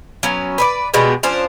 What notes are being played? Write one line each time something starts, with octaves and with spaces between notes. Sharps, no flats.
F#3 B3 C#4
B4 C#5 D5
B2 G3 G#3 B3
F3 C#4 D4 C5